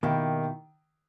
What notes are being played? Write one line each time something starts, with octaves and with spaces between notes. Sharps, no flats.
B2 D#3 A#3 E4 G4